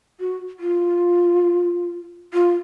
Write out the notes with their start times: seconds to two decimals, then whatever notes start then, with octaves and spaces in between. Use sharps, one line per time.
0.20 F#4
0.60 F4
2.34 F4